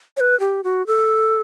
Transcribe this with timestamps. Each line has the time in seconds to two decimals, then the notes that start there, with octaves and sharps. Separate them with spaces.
0.17 C#5
0.20 B4
0.40 G4
0.64 F#4
0.87 A4